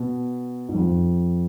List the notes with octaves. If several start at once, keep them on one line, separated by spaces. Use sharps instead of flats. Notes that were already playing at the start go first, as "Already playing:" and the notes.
Already playing: B2
G#2
F2